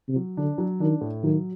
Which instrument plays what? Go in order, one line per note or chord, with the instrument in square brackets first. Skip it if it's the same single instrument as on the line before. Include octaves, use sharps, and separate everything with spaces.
[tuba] C3
[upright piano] F#3
[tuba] D3 [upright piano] D4
[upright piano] F#3
[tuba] D#3 [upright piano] D4
[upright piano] A2
[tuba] D#3 [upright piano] F#3